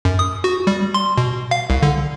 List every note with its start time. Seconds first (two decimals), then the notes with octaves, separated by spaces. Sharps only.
0.05 F#2
0.19 D#6
0.44 F#4
0.67 G3
0.94 C6
1.18 B2
1.51 F5
1.70 C2
1.83 D3